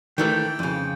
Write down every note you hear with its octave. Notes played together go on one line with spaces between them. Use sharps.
D#3 E3 A3 G5
F2 C#3